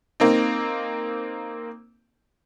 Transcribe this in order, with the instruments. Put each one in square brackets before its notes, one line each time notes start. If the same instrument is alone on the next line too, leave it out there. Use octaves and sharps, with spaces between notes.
[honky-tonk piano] A#3 C4 D#4